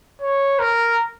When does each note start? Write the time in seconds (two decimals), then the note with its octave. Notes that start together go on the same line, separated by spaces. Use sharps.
0.21 C#5
0.59 A#4